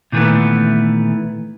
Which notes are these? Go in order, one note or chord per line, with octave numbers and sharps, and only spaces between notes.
A#2 D#3 E3 A3 B3